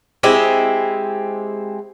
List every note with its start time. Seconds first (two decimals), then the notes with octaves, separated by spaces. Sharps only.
0.23 G#3 C4 E4 G4